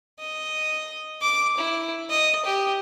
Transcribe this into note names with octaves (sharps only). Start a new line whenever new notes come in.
D#5
D6
E4
D#5
G4